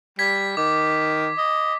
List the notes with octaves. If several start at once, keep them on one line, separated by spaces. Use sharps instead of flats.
G3 G#6 B6
D#3 D6
D#5